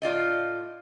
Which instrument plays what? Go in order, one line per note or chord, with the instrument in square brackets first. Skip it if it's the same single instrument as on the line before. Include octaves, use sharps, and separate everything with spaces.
[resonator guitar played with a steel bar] A2 F4 D5 D#5